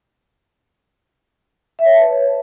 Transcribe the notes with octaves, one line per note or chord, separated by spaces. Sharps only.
E5
C#5
A5
B4